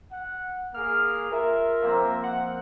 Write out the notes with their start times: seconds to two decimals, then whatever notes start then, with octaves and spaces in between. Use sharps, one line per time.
0.11 F#5
0.74 A#3 G#4 F6
1.32 F4 A#4 E5
1.82 F3 A#3 C4
2.23 F#5